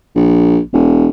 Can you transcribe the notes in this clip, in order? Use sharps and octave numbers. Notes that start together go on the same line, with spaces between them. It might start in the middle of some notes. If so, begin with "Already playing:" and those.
A#1
E1